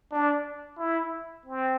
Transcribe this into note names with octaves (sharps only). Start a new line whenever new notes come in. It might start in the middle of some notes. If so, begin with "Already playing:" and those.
D4
E4
C4